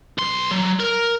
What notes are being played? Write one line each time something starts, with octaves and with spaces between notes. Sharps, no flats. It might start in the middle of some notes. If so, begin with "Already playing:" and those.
B1 C6
F#3
A#4